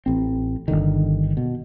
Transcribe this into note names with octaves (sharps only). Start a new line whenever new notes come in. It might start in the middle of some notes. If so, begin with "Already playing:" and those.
A1 C4
G1 C2 D3 D#3
B2